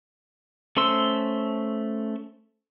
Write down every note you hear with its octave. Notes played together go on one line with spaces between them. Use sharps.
A3 C#4 C5 C6 E6